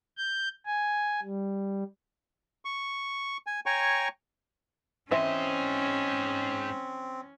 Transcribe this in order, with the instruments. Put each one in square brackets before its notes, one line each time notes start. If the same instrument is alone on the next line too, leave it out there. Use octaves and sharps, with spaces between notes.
[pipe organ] G6
G#5
G3
[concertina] C#6
G#5
C#5 G5 G#5 A#5 C#6
[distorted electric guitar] G#2 D#5 [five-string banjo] E3 C5 E5 [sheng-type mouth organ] C4 [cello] C#4